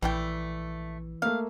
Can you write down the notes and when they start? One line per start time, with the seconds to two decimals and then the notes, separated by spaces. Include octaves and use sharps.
0.02 A#1 E3 G3 A3 G5
1.22 A3 A#3 F5